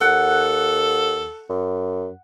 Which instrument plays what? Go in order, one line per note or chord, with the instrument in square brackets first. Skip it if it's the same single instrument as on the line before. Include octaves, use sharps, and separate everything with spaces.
[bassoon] D#2 [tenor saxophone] A4 [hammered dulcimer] F#5
[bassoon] F#2